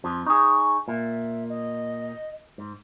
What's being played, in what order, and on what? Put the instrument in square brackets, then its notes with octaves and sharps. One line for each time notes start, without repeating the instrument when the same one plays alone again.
[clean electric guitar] F2 F3
[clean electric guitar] D#4 G#4 [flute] C#6
[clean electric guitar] A#2 [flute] E5
[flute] D#5
[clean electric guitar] G#2